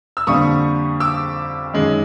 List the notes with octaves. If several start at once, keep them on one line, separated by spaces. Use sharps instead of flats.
E6
F2 D3 G3 A#3 C#6 D#6
D6 E6
F#2 D#3 G#3